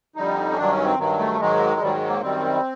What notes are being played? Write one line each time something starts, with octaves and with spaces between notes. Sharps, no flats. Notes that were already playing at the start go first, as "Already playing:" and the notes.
F2 D3 G3 D#4
C#4
G2 D#3 F#3 D4
C#4
C4
G2 D#3 F#3
A3
G#2 D#3 F#3 G#3
G#2 D#3 F#3 G3
G#3
A#3
F#2 D#3 G3 C4